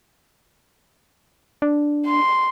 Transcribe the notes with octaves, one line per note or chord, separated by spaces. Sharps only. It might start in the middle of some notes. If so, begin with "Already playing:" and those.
D4
C6